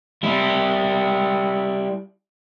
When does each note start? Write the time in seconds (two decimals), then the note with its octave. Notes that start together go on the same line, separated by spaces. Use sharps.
0.23 G3 E4